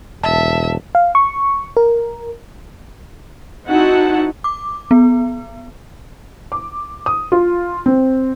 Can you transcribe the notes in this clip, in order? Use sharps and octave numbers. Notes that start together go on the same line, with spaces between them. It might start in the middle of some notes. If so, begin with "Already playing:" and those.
E1 E5 A5
F5
C#6
A#4
C4 D#4 E4 F#4 F#5 A5
D6
B3
D6
D#6
F4
C4